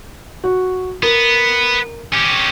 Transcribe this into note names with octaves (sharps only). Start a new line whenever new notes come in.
F#4
B3 A#4
C#4 G4